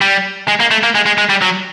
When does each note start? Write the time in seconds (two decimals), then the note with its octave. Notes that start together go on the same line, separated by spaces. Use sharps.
0.01 G3
0.48 G#3
0.60 A#3
0.71 A3
0.83 A#3
0.95 G#3
1.06 G#3
1.18 G#3
1.30 G3
1.42 F#3